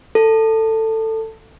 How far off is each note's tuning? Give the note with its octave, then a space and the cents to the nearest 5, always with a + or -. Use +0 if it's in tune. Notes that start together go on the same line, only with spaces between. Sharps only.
A4 +15